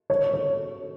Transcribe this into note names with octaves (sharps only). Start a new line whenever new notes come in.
C#5
C#5